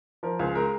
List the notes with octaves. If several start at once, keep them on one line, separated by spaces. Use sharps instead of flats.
F3 A#4
C#2 G#4
G#3 A#4